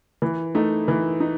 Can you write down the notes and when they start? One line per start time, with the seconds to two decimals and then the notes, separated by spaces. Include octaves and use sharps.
0.22 E3
0.55 A3 D#4
0.88 E3
1.20 D#4